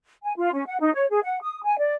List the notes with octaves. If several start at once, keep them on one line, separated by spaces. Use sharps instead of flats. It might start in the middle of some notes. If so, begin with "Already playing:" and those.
G#5
F4
C#4
F#5
D#4
C#5
G#4
F#5
D#6
G#5
D5